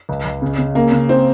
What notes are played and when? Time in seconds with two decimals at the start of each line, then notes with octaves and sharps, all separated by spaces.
0.09 C#2
0.25 C#2
0.42 C#3
0.58 C#3
0.75 C#3 A#3
0.92 C#3
1.09 C4